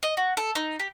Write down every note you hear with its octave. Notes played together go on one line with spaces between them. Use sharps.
D#5
F#4
A4
D#4
G4